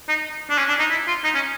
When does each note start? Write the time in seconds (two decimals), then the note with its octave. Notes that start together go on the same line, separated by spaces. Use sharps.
0.09 D#4
0.50 D4
0.58 C#4
0.68 D4
0.79 D#4
0.90 E4
1.07 F4
1.24 D#4
1.35 C#4